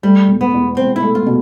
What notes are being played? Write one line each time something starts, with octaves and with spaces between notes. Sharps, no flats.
G3 A3
E1
B3
E2
E1 C4
E4
A3
F4
B2